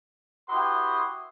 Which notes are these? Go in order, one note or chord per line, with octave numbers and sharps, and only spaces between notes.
E4 F#4 G4 B4 C6 D#6